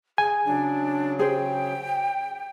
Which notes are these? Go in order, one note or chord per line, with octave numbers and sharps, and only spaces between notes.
G#4 G#5
C#3 F#3 D4
G#4 C5 G5